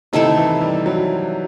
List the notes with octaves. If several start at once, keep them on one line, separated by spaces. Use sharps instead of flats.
C3 D#3 A3 E4 A4
E3
G3
F#3